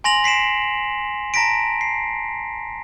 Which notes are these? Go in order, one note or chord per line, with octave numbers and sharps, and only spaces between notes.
G#5 C6 A#6 F7 F#7
B6 C7 D7 E7
A5 A#5 A#6 B6 D7
C7